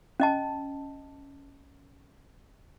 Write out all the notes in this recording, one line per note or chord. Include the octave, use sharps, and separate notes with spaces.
C#4 D#5 A5